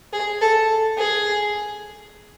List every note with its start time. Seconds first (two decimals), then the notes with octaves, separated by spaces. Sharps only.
0.13 G#4
0.41 A4
0.98 G#4